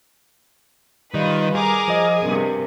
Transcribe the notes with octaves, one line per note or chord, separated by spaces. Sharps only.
D#3 G3 F4 B4 D#5
G#4 A#4 G#5 D6 D#6
F3 D#5
G2 C3 A#4